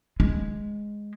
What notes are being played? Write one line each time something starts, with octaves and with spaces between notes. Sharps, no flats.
G#3